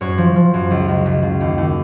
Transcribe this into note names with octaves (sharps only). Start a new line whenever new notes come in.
F#2 C#5
F3
F3
F#2
C#2
C#2
C#2
C#2
D#2
D#2